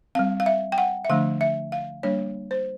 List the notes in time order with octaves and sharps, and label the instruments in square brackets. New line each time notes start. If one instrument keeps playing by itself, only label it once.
[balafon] G3 C4 F5
F5
E5
G5
F#5
E5
D3 F3 A3 D4 F5
E5
F5
G3 A#3 D4 C#5
C5